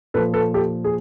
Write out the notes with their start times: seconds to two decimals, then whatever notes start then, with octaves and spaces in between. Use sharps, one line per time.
0.14 A#2 F3 A4 B4
0.34 A4 B4
0.54 G4 A4
0.84 G#4